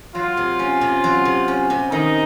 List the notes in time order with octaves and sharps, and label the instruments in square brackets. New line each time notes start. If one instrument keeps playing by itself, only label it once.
[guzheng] F#3 [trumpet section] F4
[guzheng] C3
C#4
C3
F#3
C3
C#4
C3
[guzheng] D#3 [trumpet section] D#4